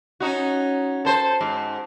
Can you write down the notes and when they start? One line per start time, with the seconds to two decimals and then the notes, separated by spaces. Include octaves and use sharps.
0.20 C#4 D#4 F#4
1.05 A4 C5
1.41 G#2